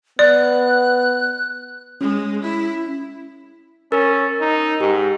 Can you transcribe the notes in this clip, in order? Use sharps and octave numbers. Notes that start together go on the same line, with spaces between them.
B3 D5 F#6
G#3 C#4
E4
C#4 A#4 E6 A6
D#4
G#2 G4